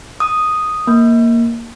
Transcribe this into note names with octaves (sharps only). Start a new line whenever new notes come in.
D#6
A#3